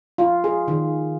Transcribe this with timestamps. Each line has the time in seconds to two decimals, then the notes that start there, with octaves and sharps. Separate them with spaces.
0.18 F4
0.44 G#4
0.68 D#3